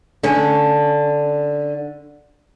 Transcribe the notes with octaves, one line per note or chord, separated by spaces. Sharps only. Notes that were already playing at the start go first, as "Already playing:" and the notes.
D3 C#4